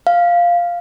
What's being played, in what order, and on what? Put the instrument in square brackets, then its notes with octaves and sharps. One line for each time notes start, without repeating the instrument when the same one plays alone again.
[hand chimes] F5